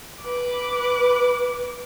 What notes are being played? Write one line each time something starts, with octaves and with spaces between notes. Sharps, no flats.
B4 D6